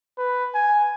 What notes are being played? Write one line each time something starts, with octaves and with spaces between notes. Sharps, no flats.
B4
G#5